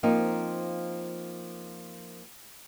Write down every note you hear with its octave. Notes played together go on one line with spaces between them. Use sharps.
F3 A#3 C4 D#4